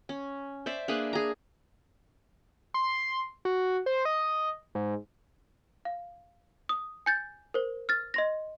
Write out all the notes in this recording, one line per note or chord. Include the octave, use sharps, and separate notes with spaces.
C#4
C5 D5 E5
A#3 D4 G#4 B4
G#4 A#5
C6
F#4
C5
D#5
G#2
F5
D#6
G#5 G6 A6
A#4 C5
F6 A6
D#5 C6 A#6